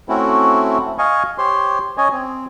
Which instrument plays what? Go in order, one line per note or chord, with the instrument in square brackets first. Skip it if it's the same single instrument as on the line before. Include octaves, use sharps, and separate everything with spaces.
[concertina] A3 C4 C#4 E4 F#4
D#5 F5 G#5 C#6
G4 C5 C#5 C6
C#4 C#5 D#5 G#5
C4